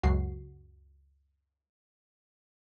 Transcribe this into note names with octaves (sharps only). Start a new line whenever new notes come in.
C#2 F#2 F#4 C7